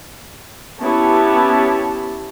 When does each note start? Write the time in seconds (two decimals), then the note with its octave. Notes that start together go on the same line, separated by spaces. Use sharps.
0.80 B3 C#4 E4 G4 C#5 A5